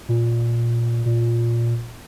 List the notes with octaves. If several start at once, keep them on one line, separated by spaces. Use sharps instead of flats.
A#2
A#2